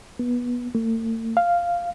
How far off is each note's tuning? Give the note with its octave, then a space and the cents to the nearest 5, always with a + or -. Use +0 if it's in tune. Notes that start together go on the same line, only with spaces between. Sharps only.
B3 -20
A3 +45
F5 -5